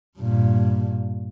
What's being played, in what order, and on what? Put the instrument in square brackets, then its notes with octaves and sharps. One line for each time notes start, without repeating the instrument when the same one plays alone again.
[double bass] G2 A#2